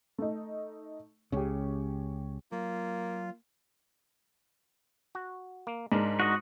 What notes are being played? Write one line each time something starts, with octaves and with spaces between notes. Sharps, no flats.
A3 D#4
C#2 C#3 C#4 G4
F#3 A#3 F4
F#4
A#3
G#2 G#3 D4 A#4
F#4 D#5